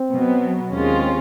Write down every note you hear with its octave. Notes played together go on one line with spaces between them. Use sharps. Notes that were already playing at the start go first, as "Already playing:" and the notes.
Already playing: C4
B2 F#3 B3
D#2 D#3 G#3 C4 C#4 F4